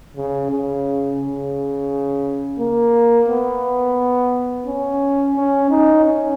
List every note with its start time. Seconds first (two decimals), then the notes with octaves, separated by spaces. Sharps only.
0.17 C#3
0.51 C#3
1.21 C#3
2.59 A#3
3.28 B3
4.67 C#4
5.37 C#4
5.71 D#4
6.06 C#4